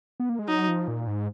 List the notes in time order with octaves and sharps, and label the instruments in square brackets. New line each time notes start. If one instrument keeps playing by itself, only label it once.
[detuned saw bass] B3
A#3
G#3
[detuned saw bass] F#3 [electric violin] D#4
[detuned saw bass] F3
A#2
G#2